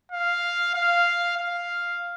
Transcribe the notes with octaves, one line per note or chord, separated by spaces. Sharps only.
F5
F5
F5